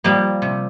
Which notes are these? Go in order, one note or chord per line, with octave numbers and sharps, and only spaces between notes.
F3 G3 A#3
C3